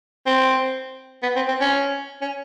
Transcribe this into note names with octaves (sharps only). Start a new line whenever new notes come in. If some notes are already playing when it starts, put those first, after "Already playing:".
C4
B3
C4
C4
C#4
C#4